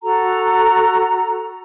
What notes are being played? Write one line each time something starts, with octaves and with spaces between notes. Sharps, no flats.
F#4 A4 A#5